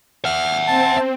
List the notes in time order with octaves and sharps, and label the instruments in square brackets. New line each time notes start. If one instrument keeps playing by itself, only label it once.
[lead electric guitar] E5 F#5 [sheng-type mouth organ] F6
[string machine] C4 [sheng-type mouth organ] A5